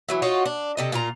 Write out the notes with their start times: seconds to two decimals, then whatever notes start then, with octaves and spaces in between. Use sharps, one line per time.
0.09 E3 F#3 E4
0.22 D#4 F4 F#4 C#5
0.46 D4
0.77 C3 A4 D#5
0.92 A#2 F4 A#5